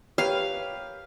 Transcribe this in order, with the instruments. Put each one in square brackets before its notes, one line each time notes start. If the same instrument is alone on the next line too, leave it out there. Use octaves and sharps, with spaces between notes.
[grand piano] G4 A#4 B4 [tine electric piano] C#5 [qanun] F5